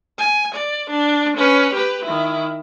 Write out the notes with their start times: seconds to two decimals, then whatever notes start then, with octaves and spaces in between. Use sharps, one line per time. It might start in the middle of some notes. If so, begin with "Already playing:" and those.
0.19 G#5
0.55 D5
0.90 D4
1.38 C#4 B4
1.74 G4 B4
2.05 D#3 E4